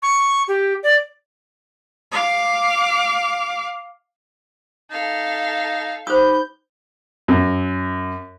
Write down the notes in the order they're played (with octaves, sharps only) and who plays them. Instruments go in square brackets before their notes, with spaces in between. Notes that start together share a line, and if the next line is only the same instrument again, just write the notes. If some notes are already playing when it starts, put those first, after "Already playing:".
[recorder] C#6
G4
D5
[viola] F5 D6
[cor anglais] D#4 [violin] A4 F5
[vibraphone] D#4 B5 [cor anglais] G4 [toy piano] C5 D#6 [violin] G6
[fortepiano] F#2